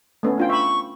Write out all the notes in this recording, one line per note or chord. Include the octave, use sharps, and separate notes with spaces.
A3 B3 C#4
D4 F4 G5
E5 B5 C#6